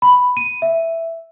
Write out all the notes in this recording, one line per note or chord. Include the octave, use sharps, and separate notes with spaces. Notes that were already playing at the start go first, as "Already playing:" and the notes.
B5
D#7
E5